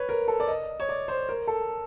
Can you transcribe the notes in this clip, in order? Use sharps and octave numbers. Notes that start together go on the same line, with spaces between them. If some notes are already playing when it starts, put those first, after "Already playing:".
Already playing: B4 C#5
A#4
A4
D5
D#5
C#5
D5
C5
A#4
A4